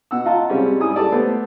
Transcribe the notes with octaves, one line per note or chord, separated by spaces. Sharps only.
B2 F#5 E6
F4 D#5 F5 F#5 A5 A#5
C3 G3 G#3 C4 C#4
G#2 G3 E4 G#5 D#6
G4 A4 D5 A5
A3 B3 C5